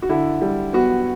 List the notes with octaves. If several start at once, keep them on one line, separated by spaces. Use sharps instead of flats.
F#4
D3 E4
G3
B3 F#4